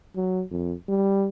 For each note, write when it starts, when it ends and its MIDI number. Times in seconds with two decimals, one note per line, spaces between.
0.16 0.43 54
0.51 0.74 41
0.89 1.29 55